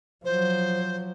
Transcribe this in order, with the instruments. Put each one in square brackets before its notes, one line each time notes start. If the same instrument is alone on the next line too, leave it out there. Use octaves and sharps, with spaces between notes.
[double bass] F3 F#3 [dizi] C5